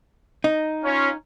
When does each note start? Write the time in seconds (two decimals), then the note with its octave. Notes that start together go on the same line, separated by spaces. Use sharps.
0.44 D#4
0.83 C#4 F4